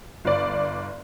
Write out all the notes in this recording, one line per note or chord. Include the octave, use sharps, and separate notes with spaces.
G1 D5